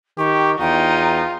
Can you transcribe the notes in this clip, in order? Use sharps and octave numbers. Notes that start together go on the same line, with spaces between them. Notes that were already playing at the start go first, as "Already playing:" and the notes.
D#3 G4 C#6
E2 D#4 F4 G5